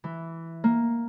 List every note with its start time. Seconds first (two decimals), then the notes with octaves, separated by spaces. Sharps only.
0.04 E3
0.64 A#3